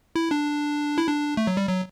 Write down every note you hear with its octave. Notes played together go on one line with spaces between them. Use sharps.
E4
D4
E4
D4
A3
F#3
G3
F#3